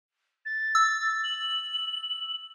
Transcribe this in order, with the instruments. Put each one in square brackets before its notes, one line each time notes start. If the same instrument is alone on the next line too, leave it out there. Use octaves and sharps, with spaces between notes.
[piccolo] A6
[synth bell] E6
[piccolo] F#7